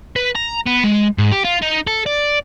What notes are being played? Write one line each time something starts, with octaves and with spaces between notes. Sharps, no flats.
B4
A#5
B3
G#3
G#2
G4
F4
D#4
A4
D5